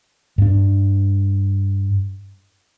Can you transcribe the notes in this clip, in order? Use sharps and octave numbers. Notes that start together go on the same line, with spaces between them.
G2 D4